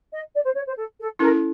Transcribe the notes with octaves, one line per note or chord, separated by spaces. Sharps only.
D#5
D5
C5
C#5
C5
A4
A4
C#4 E4 A4 A#4